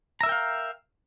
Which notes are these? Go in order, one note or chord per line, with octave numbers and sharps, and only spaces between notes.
A#4 E5 F5 G5 A#5